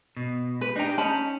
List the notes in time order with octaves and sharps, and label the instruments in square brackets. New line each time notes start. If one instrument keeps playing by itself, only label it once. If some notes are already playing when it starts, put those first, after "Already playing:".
[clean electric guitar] B2
[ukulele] B4
[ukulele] D4 A#5 [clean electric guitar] D#4 G4
[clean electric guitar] C#4 [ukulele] D#4 A5 B5